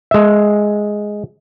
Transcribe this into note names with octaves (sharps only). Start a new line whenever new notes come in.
G#3 E5